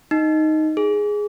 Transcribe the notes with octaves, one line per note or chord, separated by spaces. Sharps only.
D#4
G#4